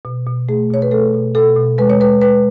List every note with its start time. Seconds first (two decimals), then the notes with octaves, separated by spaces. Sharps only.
0.05 B2
0.27 B2
0.49 A3 G#4
0.70 B2 C#5
0.82 B4
0.91 A3 A4
1.14 B2
1.35 B2 A4
1.56 B2
1.78 G#3 B4
1.90 C#5
2.00 G#3 B4
2.22 G#3 B4